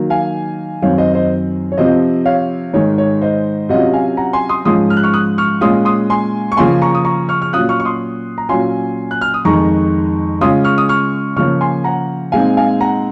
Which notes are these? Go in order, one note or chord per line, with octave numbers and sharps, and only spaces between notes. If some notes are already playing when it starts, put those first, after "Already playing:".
Already playing: D#3 F#3 A#3
F5 G#5
F#2 D#3 F#3 C4 C#5 F5
C5 D#5
C5 D#5
C#5
C3 F3 C4 F4 C5 D#5
C#5 F5
G#2 D#3 G#3 D#4 C#5
C#5
C5 D#5
C3 F#3 C#4 F4 D#5 F#5
F5 G#5
F#5 A#5
G#5 C6
C6 D#6
G#2 F3 G#3 C#4 F4 C6 D#6
F6
F#6
C#6 F6
D#6 F#6
C#6 F6
A#2 G#3 C#4 F4 C6 D#6
C6 D#6
G#5 C6
C#6
C#3 F3 A#3 C#4 F4 G#5 C6
A#5 C#6
D#6
A#5 C#6
C#6 F6
F6
A#2 F#3 C#4 F4 D#6 F#6
C#6 F6
C#6
C6 D#6
A#5
A#2 F#3 C#4 F4 G#5 C6
F#6
F6
D#6
F2 D#3 G#3 D#4 A#5 C#6
C#3 G#3 C#4 F4 C6 D#6
C#6 F6
D#6
C#6 F6
C#3 F3 A#3 C#4 C#6 F6
G#5 C6
F#5 A#5
A#2 G#3 C4 D#4 F5 G#5
F5 G#5
F#5 A#5